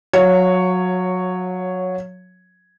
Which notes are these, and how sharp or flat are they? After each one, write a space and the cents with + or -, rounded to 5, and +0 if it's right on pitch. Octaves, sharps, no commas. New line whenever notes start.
F#3 -20 C#5 +0 F5 +0